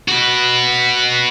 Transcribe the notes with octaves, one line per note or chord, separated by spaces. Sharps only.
F#4 B4